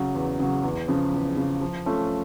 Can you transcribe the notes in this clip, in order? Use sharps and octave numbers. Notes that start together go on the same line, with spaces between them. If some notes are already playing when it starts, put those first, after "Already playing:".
Already playing: C#3 F#3
E2
C#3 F#3
E2
C#3 F3
E2
C#3 F3
F3
A3 C#4 F4